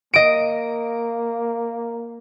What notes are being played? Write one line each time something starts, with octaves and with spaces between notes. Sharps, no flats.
A#3 D#5 D7